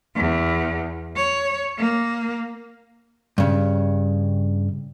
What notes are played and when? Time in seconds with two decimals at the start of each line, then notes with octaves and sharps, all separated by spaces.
0.16 E2
1.16 C#5
1.78 A#3
3.38 G2 C#3